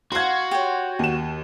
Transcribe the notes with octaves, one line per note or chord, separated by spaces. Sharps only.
F#4 C5 F5 C6 G#6
G4 C#5
D#2 E7